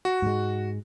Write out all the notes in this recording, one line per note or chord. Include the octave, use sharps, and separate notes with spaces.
F#4
G#2 G#3